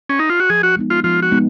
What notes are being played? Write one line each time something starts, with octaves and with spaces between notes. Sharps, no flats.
C#4
D#4
F4
F#4
F3 G#4
F#4
G#3 B3 D#4
F4
F3 F4
F#4
G#3 B3 D#4